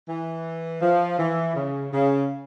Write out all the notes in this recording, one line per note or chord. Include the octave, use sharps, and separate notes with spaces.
E3
F3
E3
C#3
C#3